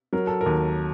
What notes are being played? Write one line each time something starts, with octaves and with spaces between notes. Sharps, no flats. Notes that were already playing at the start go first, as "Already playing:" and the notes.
F#3 A#4
A4
A#4
D#2